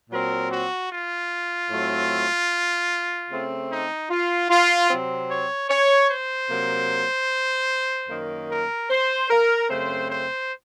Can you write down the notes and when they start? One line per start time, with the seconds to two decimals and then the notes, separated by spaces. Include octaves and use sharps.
0.10 A#2 F#3 C4 A#4
0.51 F#4
0.90 F4
1.70 A2 F#3 A3 C4
3.30 C#3 A3 C4
3.70 D#4
4.10 F4
4.50 F4
4.90 C3 F#3 C4
5.30 C#5
5.70 C#5
6.10 C5
6.50 C3 F#3 A#3
8.09 F#2 D#3 A#3
8.49 A#4
8.90 C5
9.30 A#4
9.69 F#2 C#3 A3 C4 C5
10.10 C5